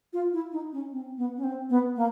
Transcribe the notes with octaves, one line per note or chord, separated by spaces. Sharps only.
F4
E4
D#4
C#4
C4
B3
C#4
C4
B3
A#3